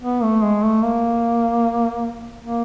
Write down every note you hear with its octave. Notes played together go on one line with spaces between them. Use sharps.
B3
A3
G#3
A3
A#3
A#3